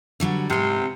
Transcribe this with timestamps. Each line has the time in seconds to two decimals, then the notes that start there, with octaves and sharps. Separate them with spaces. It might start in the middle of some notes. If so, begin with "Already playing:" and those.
0.20 D3 F#3 G3
0.50 G#2 C3 C4